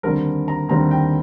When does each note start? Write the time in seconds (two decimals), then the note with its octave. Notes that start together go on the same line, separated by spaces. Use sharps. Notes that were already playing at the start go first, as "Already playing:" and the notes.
0.03 D#2 D3 G3 C4 A#4
0.48 A#5
0.69 D#2 D3 G3 C4 A#5
0.91 G5